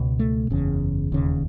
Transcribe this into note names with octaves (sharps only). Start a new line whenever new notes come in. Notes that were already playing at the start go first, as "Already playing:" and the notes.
Already playing: C#2 B2
A3
F#1 E2 C#3
E1 D#2 C#3